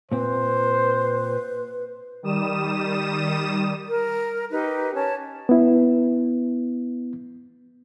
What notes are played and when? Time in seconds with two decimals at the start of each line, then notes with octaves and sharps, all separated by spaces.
0.12 A#2 C4 B4 C5
2.23 D#3 G3 D#6 E7
3.89 A#4
4.50 D#4 G4 B4
4.94 C#4 C#5 A5
5.49 B3 E4